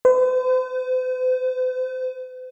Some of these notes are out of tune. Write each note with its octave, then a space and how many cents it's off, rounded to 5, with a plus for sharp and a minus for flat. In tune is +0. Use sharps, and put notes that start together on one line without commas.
C5 -45